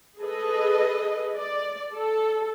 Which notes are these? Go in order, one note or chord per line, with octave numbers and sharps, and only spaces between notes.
G#4 A4 B4 D#5
D5
A4